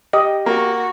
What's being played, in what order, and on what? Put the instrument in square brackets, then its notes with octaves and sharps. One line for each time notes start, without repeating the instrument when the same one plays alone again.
[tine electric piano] G4 [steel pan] D#5
[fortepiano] A#3 [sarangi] F#4